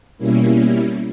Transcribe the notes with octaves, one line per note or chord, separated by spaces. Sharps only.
B2 G3 A#3 C#4 E4